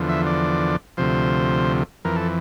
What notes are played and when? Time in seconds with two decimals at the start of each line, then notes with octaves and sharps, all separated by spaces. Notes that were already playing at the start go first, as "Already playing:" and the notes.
Already playing: E2 D3 F3
0.09 E5
0.27 D5
0.97 D2 C3 F3 C5
2.05 F2 E3 A#4
2.16 A4